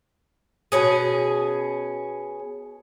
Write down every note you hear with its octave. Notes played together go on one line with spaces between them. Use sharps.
B2 C#4 G#4